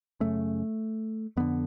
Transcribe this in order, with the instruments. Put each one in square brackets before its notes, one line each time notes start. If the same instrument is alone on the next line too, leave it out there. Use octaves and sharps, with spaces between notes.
[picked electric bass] F#2 C#3 A3
F2 D3 B3